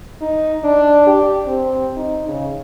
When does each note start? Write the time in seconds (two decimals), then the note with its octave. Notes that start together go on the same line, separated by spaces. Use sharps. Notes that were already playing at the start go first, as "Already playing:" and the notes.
0.21 D#4
0.64 D4
1.07 G4
1.46 C4
1.96 D#4
2.28 C#3